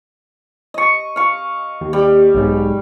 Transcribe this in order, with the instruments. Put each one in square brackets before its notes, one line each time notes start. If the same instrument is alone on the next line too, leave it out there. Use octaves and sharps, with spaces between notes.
[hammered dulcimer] D#5 C#6
F5 C#6
[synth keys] D#2
[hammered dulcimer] G3
[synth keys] B1 G#2